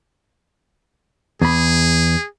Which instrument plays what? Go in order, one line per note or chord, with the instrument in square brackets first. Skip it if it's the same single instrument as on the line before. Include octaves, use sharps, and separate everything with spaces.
[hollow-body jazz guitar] E2 B5 [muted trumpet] G#4